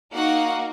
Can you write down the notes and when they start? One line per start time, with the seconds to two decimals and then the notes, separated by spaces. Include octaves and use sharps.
0.14 A#3 D#4 F#4 F#5